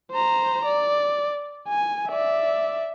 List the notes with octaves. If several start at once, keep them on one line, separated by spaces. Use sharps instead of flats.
C5 A#5
D5
G#5
D5 E5